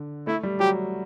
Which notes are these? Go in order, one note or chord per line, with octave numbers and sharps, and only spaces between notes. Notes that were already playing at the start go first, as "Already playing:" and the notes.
Already playing: D3
A3 E4
G3
F#3 G4